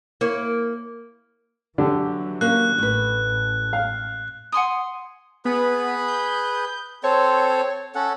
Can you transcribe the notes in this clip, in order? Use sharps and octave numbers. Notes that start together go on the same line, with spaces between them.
A#3 E4 C#5
D3 E3 F#3 G4
A#3 C#4 F#6
A1 A2 B4
F5
F#5 G#5 C6 D#6
B3 G#4 B4 B5
G6
C4 A4 C5 C#5
C#4 A4 F#5